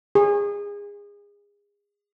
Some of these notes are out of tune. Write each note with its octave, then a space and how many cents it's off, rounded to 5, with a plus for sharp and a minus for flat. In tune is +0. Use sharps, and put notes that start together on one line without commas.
G#4 -30